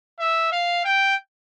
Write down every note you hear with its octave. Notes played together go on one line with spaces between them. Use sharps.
E5
F5
G5